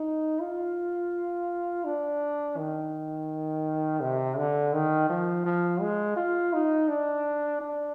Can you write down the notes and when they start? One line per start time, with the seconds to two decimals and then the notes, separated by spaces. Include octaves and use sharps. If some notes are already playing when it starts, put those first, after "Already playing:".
Already playing: D#4
0.41 F4
1.85 D4
2.57 D#3
4.02 C3
4.37 D3
4.73 D#3
5.10 F3
5.45 F3
5.81 G#3
6.16 F4
6.53 D#4
6.88 D4
7.61 D4